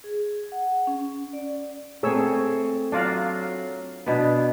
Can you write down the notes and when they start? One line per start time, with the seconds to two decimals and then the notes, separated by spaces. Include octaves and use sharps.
0.04 G#4
0.52 F#5
0.87 C#4
1.33 D5
2.03 A3 C4 G#4 C#5 E6
2.92 F#3 D4 F4 F#4 D5 F5
4.06 B2 B3 D4